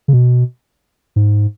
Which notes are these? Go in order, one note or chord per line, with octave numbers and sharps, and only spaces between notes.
C#3
B2
G#2